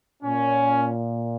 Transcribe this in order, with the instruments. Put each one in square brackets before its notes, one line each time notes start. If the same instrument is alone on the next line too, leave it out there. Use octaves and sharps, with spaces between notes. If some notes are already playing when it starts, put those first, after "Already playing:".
[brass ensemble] A#2 C#4